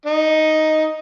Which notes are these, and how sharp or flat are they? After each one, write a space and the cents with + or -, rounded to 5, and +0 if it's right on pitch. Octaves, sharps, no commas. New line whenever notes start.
D#4 +5